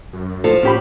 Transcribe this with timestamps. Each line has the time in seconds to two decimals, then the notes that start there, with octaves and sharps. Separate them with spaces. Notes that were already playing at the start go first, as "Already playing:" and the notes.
0.13 F#2
0.44 A2 F3 A4
0.63 A2 C#4 G4 B5